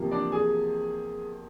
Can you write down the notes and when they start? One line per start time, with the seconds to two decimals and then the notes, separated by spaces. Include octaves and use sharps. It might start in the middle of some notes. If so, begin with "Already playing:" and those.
Already playing: E2 C3 F3 A#3
0.11 D4 D5
0.32 G#4 G#5